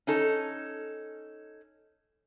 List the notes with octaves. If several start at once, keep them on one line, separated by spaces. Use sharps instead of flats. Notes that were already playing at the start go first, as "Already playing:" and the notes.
C#4 D#4 A4